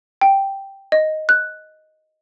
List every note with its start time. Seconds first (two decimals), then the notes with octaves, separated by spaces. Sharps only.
0.21 G5
0.92 D#5
1.29 F#6